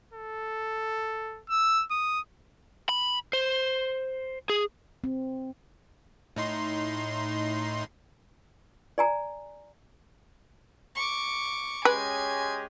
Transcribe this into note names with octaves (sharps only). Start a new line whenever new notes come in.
A4
E6
D#6
B5
C5
G#4
C4
A2 D#4 C6
D5 G#5 A#5
C#6 D6
G#3 C#4 G4 B4 G#5